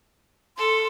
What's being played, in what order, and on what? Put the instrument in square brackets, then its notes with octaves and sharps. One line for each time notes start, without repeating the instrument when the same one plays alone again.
[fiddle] A4 [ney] C6